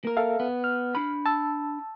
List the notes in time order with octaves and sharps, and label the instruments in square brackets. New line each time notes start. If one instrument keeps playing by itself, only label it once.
[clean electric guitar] A#3 A#4
[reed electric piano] A4 E5 F5
[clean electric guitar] B3
[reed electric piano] F6
[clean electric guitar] D4 B5
[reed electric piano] A5 E6